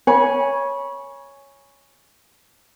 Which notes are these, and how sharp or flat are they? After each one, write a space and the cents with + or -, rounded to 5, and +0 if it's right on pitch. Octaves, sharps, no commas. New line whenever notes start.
C#5 +0 G#5 +0 B5 -30